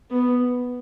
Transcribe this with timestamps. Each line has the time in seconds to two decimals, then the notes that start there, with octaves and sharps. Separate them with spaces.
0.10 B3